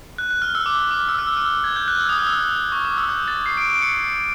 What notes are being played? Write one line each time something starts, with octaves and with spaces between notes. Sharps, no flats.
F#6
F#6
F6
E6
D6
D6
E6
F6
E6
F6
E6
G#6
G6
F#6
E6
D#6
F6
E6
C#6
D6
E6
G6
A6
C7
D7
D7
C#7